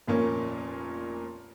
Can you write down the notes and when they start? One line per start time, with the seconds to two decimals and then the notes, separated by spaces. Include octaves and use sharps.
0.08 F1 A#2 A#3 C#4